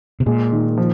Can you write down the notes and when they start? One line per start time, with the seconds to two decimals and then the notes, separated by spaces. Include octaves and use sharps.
0.20 C3
0.26 A#2 G#3
0.52 D#3
0.77 F3